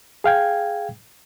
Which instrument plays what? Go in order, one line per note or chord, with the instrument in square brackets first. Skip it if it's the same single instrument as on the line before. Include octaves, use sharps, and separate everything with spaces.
[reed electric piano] G#4 F5 G5 G#6